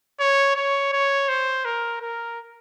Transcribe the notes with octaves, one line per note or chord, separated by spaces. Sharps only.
C#5
C#5
C#5
C5
A#4
A#4